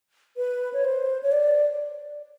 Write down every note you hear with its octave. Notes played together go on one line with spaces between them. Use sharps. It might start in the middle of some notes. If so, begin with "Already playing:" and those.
B4
C#5
C5
C#5
D5